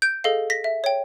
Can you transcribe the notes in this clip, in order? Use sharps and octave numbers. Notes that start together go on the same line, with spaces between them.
G6 D7
G#4 A4 D#5 F5
A#6 B6
E5
C#5 G5